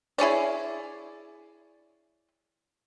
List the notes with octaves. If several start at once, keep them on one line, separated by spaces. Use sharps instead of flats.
E4 G#4 C#5 D5